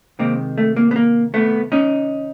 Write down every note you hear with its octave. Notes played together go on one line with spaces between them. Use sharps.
C3 D#3 G#3 A#3 C4
A3
A#3
B3
A#3
A3 B3
C#4 D#4